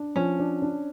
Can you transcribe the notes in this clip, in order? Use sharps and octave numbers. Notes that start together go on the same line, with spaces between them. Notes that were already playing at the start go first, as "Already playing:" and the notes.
Already playing: D4
F3 C#4
D4
D4